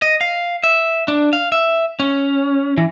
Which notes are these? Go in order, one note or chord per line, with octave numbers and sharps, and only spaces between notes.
D#5
F5
E5
D4
F5
E5
C#4
E3